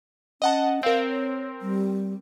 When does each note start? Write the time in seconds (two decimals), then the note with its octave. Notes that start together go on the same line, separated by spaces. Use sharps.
0.42 C#4 D#5 F#5 A5
0.83 C4 A#4 F5
1.09 C#5
1.62 G3